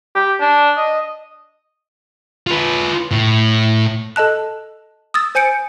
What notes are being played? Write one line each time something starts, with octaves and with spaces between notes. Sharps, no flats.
G4
D4
D#5
F4 B4
A2
A4 D#5 A5 F#6
D#6 E6 A6
C5 G#5 G6 C#7 D7